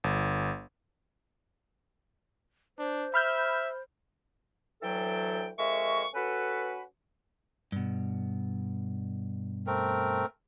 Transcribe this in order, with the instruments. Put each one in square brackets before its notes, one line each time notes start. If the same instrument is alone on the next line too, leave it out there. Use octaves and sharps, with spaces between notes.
[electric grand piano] G1
[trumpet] D4 [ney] C5
[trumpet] E5 [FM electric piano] B5 F6 G6
[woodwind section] D2 E3 F#3 A4 G5
F2 G#3 A#4 E5 C#6
C#4 F#4 A4 B4
[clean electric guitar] G2 B2
[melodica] A3 C4 A#4